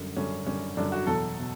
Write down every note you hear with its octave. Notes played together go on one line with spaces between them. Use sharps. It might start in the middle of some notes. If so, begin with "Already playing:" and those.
Already playing: F#2 D3 G3
F#2 D3 G3 C#4
F#2 D3 G3 C#4
F#2 D3 G3 D4
F#4
E2 B2 F#3 A4
B2